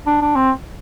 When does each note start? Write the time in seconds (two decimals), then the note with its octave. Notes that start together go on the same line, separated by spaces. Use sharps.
0.07 D4
0.22 D4
0.36 C4